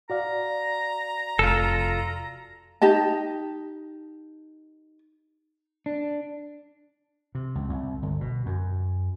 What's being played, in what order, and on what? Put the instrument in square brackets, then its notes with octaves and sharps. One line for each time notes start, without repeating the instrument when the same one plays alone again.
[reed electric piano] F#4 D5 F5 [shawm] A#5
[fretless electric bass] F1 [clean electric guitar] F4 A4
[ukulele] D#4 G4 D#5 A5
[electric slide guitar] D4
[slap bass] C3
C#2
C2
G1
B2
F#2